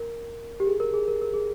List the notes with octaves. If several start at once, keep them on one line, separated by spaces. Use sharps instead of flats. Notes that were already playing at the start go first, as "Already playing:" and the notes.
Already playing: A#4
G4
G#4
A#4
G#4
A#4
A#4
G#4